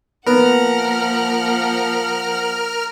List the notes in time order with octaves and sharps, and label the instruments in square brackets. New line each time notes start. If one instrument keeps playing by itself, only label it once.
[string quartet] F3 F#5 [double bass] A#3 [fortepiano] B3 [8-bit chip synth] A#4 F6